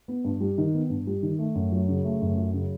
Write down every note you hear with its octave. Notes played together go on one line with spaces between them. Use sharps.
B3
G2
G3
D#3
B3
G2
G3
D#3
A3
F#2
F#3
C#3
A3
F#2
F#3
C#3